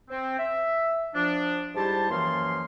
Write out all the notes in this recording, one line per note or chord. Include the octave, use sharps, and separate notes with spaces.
C4
E5
F3 D4
G#2 G3 E4 G4 C5 A5
F#2 E3 F3 A#3 F5 C6